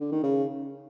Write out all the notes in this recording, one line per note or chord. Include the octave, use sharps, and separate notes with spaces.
D3
D#3
C#3